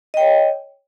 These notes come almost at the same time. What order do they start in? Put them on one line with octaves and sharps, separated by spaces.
D#5 G5 C#5